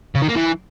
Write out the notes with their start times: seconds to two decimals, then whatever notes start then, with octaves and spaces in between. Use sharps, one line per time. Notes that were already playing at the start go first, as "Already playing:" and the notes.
0.15 C#3
0.22 D#3
0.29 A#3
0.35 E3